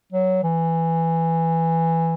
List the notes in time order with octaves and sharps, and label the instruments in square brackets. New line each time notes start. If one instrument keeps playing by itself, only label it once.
[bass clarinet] F#3
E3